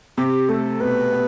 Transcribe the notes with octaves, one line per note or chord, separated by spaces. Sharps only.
C3 G4
A3 A4
B2 B4
B3